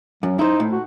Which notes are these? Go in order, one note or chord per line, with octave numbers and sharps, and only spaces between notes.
F#2 F#3
D#4 E4 C5
A2
F#4